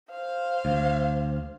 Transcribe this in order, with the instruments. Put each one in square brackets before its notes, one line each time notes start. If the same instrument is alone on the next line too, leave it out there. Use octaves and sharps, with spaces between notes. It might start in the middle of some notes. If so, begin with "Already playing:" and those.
[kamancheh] C5 F5
[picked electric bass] D2